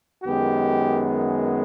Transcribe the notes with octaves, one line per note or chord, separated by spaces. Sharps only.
F#2 D#3 G#3 B3 G4